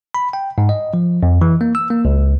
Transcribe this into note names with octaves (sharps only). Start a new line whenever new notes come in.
B5
G5
G#2
D#5
F3
F2
E3
A#3
E6
A#3
C#2